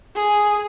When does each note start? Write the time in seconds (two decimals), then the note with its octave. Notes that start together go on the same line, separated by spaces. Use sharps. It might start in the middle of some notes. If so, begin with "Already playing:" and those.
0.16 G#4